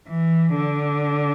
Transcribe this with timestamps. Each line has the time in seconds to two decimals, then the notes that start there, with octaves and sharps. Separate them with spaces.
0.09 E3
0.55 D3